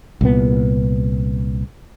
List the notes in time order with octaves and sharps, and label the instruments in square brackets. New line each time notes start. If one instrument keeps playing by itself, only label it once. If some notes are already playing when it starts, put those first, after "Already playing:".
[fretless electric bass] C2 A#2 B3